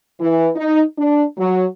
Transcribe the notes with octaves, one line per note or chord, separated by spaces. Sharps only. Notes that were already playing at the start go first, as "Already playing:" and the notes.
E3
D#4
D4
F#3